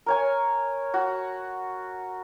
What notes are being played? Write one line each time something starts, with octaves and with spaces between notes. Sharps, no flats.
A#4 C#5 G#5
F#4